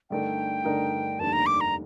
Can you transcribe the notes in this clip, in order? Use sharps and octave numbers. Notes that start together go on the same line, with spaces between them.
G2 D3 A3 D#4 A#4 G5
G2 D3 A3 D#4 A#4
F1 D#2 D3 G3 A5
A#5
D6
A#5